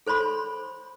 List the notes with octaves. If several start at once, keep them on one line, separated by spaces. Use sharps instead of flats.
A4 C5 C#5 B5 C6